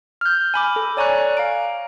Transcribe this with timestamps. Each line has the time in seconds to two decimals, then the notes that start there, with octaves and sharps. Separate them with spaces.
0.21 F6 G6
0.54 G#5 B5 D6
0.76 A4
0.97 C#5 D5 G#5 A#5 C#6 F#6
1.37 F5 A#5 D7